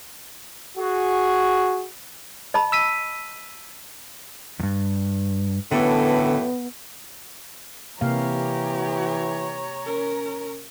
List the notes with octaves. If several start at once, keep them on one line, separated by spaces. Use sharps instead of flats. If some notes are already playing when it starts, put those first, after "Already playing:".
F#4 G#4
D#5 A5 B5
E6 B6 D#7
E2 G2
F#2 A2 D3 E3 B3 A4
C3 E3 A#3 G4 C#5 F5 A#5
C#4 A#4